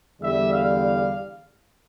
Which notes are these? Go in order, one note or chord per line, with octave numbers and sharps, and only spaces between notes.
E2 D3 G3 E5
F5